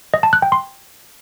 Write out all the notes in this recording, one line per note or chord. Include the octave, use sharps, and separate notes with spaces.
D#5
A5
F#6
G5
C6